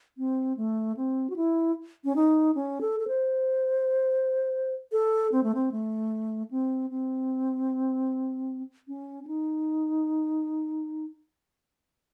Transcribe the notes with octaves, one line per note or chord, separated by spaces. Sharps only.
C4
A3
C4
F#4
E4
C#4
D#4
C#4
A4
A4
C5
A4
C4
A3
C4
A3
C4
C4
C#4
C#4
D#4